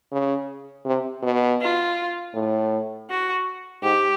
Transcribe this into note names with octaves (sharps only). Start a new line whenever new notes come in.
C#3
C3
B2
F4
A2
F#4
G#2 G4